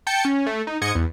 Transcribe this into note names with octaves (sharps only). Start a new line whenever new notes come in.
G5 A5 G6 C#7
C#4
A3
D#4
G#2 D#5 G#6 C#7
E2